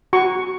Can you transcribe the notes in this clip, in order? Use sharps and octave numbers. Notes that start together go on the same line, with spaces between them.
F#4 C#6